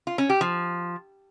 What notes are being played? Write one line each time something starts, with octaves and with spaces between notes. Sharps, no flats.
F4
C#4
G4
F3